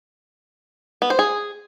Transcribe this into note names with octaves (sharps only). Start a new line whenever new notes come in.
B3
C5
G#4